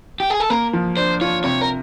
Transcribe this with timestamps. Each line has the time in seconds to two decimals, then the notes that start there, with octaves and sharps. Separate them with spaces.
0.20 G4
0.30 G#4
0.40 A4
0.50 A#3 A#4
0.73 F3
0.97 D4 C5
1.21 F4 C#5
1.44 C3 C#5
1.61 A#4